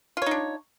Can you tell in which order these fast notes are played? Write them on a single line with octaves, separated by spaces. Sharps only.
F4 C#5 D#4 D4